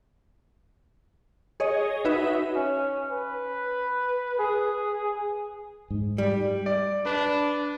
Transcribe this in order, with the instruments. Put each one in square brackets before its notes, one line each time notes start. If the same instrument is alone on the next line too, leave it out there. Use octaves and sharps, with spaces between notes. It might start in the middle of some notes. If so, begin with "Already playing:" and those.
[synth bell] G#4 C#5 D#5
D#4 F#4 B4 E5
[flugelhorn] C#4
B4
G#4
[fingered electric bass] G#2
[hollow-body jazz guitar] G3
[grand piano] D5
[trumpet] D4 [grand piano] B4